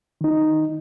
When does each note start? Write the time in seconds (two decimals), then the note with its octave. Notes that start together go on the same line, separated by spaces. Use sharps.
0.21 D#3 D#4